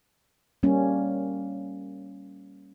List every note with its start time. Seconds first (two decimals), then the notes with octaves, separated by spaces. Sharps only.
0.63 G3 A#3 C#4